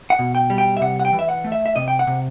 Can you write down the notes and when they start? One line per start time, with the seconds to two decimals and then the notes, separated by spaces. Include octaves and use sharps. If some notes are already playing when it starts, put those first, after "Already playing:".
0.10 F#5
0.19 B2
0.35 G5
0.50 G3
0.58 G5
0.77 E5
0.81 C3 F#5
1.00 F#5
1.05 G5
1.13 E3
1.19 E5
1.29 F#5
1.44 A3
1.52 E5
1.66 E5
1.76 C3 D#5
1.88 G5
1.99 F#5
2.07 C3